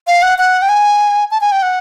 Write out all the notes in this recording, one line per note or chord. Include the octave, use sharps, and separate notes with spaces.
F5
F#5
F#5
G5
G#5
A5
G#5
G5
F#5